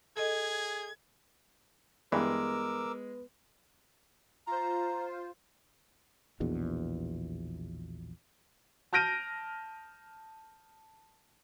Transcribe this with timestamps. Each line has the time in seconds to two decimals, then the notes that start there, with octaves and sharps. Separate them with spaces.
0.17 G#4 A4 D#5 G#6
2.12 G2 E3 G#3 B3 A#4 D6 E6
4.47 F4 C5 A#5
6.40 A#1 E2 B2
8.93 A5 F6 G6 A#6 D7 D#7